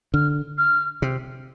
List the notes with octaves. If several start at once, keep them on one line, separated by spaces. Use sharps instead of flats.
D3 F6
F6
C3